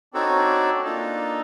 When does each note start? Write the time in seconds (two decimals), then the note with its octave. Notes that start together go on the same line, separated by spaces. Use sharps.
0.14 C4 D4 D#4 F#4 A4 C#5
0.26 C#4
0.38 D4
0.84 A#3 D4 D#4 F4 A4